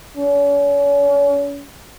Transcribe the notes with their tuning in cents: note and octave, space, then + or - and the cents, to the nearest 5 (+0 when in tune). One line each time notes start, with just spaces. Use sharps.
C#4 +40